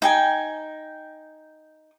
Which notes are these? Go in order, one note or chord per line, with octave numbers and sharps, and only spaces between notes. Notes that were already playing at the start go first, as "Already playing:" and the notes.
D#4 G5 G#5